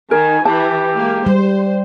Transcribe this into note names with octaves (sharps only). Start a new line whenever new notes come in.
D#3 A#4 G#5
E3 G4 A5
G#3 A#3
G3 C5